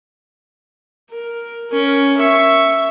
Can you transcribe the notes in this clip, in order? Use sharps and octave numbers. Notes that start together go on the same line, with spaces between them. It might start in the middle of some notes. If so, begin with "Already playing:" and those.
A#4
C#4 A#4
E5 C#6